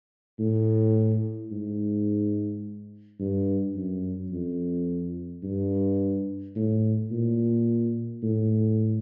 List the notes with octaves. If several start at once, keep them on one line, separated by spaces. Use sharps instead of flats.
A2
G#2
G2
F#2
F2
G2
A2
A#2
A2